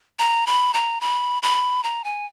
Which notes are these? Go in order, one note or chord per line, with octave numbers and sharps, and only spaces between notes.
A#5
B5
A#5
B5
B5
A#5
G#5